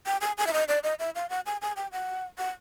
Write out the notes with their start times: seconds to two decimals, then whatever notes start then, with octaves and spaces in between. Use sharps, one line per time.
0.06 G5
0.21 G#5
0.38 G#5
0.47 E5
0.53 D#5
0.68 D5
0.84 D#5
0.99 E5
1.15 F5
1.30 F#5
1.46 G#5
1.62 G#5
1.76 G5
1.92 F#5
2.38 F#5